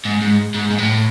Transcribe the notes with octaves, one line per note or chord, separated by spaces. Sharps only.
G#2
G#2
G#2
G#2
A2